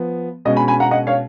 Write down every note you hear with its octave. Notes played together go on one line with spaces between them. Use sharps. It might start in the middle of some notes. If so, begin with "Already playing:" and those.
Already playing: F3 B3
B2 G#3 C#4 D#5
G#5 B5
G#5 B5
F#5 A#5
D#5 F#5
C#5 F5